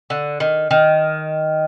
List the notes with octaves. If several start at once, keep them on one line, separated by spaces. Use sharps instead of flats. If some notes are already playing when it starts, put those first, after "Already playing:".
D3
D#3
D#3